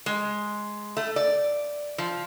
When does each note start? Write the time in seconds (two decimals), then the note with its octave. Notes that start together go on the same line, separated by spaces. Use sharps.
0.06 G#3
0.97 A3
1.16 D5
1.98 F3